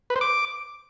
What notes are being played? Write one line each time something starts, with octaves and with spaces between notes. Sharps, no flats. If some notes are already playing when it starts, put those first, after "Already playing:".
B4
C5
D6